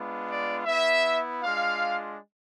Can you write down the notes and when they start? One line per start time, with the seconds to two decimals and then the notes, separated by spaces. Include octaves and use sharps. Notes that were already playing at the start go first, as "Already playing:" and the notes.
Already playing: G#3 B3 D4 F4
0.28 D5
0.66 B3 E4 E5
1.42 G#3 D4 F4 F5